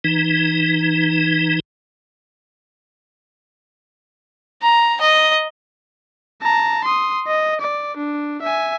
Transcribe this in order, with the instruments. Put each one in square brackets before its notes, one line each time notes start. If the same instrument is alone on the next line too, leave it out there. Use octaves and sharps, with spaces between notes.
[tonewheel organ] E3 D#4
[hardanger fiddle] A#5
D#5
[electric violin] A5 A#5
C6 D#6
D#5
D5
D4
E5 G#5